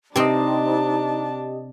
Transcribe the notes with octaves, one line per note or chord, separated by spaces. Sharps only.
C3 C4 D4 D#4 G4 D#5 A5